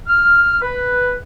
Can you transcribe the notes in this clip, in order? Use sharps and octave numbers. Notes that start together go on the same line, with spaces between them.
F6
B4